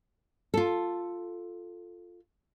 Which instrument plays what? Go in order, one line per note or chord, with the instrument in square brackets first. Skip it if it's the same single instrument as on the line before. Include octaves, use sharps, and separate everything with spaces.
[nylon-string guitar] F4 A4